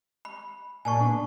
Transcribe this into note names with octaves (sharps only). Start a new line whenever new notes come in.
B5
A#2 G#5 A5 C#6
B3 D4 B4